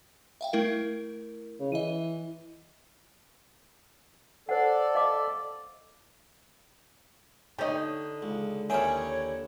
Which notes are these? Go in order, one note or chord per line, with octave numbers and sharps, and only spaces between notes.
E5 F5 G5
A3 E4 A#4
C#3
E3 D#5 D#7
A4 C5 D5 F#5
D#5 F5 D6
D3 D#4 G4 C#5 D#5
C#2
D#2 C#4 E4 G#4 C#5 G5